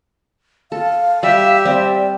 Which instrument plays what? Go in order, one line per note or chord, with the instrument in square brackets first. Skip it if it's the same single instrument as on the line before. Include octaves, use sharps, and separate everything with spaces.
[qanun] A4 [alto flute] F5
[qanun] G3 [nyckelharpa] G4 E5
[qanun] G3 C4 [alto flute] D5